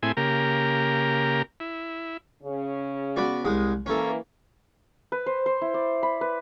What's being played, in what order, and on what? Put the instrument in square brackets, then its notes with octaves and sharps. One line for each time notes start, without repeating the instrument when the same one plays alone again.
[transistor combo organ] A2 C4 E4 G#4 G#5
C#3 A#3 G4 A#4
E4
[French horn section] C#3 C#4
[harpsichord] B3 F#4 D5
C2 G#3 D#6
[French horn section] E3 A#3 [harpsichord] C#4 A4
[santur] B4
C5
C5
E4
D5
B5
B4